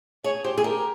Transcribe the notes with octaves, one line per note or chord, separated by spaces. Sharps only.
G#4 C#5
G4 C5
G#4
G4 A#4